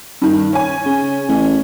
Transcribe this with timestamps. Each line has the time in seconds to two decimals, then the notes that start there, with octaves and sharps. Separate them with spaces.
0.22 G2 D#3
0.53 C#4 G#5
0.86 C#3
1.28 A1